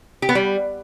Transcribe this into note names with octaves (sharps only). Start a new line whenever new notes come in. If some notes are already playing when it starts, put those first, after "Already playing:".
G4
B3
G3